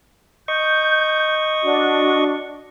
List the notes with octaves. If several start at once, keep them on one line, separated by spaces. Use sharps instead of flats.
D#5 C#6 G6
D4 F#4